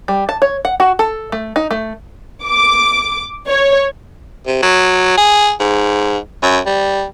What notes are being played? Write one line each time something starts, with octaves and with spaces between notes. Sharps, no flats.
G3
A5
C#5
F#5
F#4
A4
A3
D#4
A3
D6
C#5
C3
F#3
G#4
G#2
F#2
G3